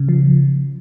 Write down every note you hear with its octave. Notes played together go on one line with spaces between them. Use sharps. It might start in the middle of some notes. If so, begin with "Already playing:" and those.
Already playing: C#3
F3